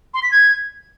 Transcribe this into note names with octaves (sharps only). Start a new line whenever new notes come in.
C6
B6
G#6